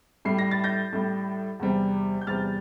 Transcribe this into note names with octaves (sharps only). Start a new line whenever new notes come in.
A2 G3 C7
A#6
A6
G6 A#6
A2 G3
E2 C3 G3
G6
E2 C3 G3 F6 A6